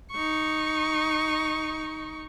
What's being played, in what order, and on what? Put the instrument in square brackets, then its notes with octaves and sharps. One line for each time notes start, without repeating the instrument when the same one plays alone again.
[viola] D#4 C#6